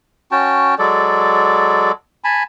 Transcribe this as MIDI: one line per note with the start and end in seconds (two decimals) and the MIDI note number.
0.32 0.75 61
0.32 0.75 66
0.32 0.75 79
0.32 0.75 81
0.79 1.92 54
0.79 1.92 56
0.79 1.92 69
0.79 1.92 74
2.24 2.43 80
2.24 2.43 81
2.24 2.43 83